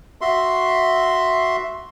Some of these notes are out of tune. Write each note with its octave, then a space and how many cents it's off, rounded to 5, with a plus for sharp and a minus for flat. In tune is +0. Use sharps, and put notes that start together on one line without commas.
F#4 +0 E5 +0 C6 +0